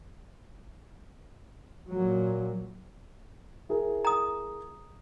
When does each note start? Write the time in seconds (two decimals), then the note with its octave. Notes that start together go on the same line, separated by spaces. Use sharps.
1.90 A#2 F#3
3.69 E4 G#4 A#4
4.05 A#5 D#6